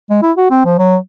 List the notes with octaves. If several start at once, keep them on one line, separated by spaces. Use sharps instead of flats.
G#3
E4
F#4
C4
F3
F#3